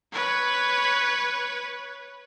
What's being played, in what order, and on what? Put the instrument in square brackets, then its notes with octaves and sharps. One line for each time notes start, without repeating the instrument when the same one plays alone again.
[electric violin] B4 C#5